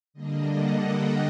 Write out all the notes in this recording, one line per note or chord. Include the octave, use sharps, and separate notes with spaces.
D3 G3 A#3 D4 D#5
F#5
G5